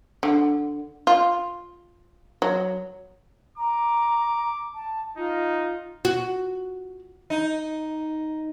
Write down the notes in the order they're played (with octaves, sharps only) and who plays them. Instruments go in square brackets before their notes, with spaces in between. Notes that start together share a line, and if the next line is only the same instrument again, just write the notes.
[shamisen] D3
F4
F#3
[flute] A#5 [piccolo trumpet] D6
[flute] A5
[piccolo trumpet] D#4 [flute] F4
[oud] F#4
[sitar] D#4